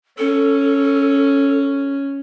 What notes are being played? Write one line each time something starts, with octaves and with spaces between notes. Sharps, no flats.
C#4 A4